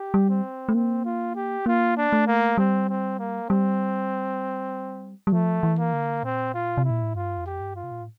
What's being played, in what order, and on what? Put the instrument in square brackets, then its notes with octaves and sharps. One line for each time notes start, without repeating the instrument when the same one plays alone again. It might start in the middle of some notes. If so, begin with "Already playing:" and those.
Already playing: [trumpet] G4
[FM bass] G3
[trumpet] C4
[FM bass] A3
[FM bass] A#3 [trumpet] C4
[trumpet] F4
G4
[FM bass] A#3 [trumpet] F4
[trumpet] D4
[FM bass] A3
[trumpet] A#3
[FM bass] G3 [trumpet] C4
[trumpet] C4
A#3
[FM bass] G3 [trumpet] C4
[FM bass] G3
[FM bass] F3 [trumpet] A3
[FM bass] E3
[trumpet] A#3
[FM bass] D3
[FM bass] A#2 [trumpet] C4
[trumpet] F4
[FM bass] C3
[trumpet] E4
[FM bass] A#2
A2
[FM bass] G2 [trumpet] F4
[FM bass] F2
[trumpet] G4
[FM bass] G2
[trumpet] F4
[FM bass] C3
A#2
A2